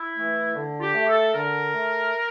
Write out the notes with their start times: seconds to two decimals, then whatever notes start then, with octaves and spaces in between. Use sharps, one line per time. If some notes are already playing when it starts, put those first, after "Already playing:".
Already playing: E4
0.16 E3 A3
0.55 D3
0.77 F4
0.81 G4
0.95 A3
1.08 A4
1.34 D3 A#4
1.74 A3